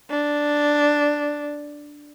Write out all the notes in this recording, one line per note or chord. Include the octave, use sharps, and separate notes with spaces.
D4